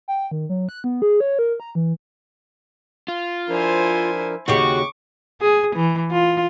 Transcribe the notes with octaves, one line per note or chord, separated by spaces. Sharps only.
G5
D#3
F#3
F#6
B3
G#4
C#5
A#4
A#5
E3
F4
F3 D4 E4 A#4 C5 G#5
D#2 C#3 F#4 G4 C#6 D6
G#4
E3
F4